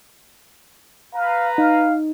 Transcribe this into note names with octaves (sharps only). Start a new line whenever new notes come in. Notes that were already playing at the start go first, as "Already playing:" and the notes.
B4 F5 A#5
D#4 F5